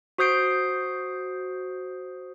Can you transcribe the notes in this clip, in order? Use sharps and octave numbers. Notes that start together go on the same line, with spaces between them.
F#4 C5 D#6 G6 C7 D7